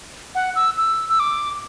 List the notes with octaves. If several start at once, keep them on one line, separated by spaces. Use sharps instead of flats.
F#5
E6
E6
E6
D6